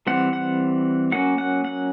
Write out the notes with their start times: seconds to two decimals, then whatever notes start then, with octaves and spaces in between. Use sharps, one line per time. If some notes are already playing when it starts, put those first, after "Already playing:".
0.07 E3 G3 C4 F#5
0.33 F#5
1.12 F#3 A#3 C#4 F#5
1.38 F#5
1.65 F#5